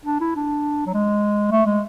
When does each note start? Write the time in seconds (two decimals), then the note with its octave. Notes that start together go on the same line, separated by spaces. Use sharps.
0.06 D4
0.21 E4
0.36 D4
0.86 F#3
0.94 G#3
1.51 A3
1.66 G#3